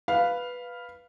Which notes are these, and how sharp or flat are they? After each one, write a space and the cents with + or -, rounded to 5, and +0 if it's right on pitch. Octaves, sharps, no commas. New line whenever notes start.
B4 +0 F5 +0